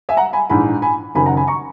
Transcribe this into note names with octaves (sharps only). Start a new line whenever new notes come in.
E5 G#5
F#5 A#5
G#5 B5
A#1 G#2 E3 G#5 B5
G#5 B5
F#1 F#2 D#3 G#5 B5
F#5 A#5
G#5 B5
A#5 C#6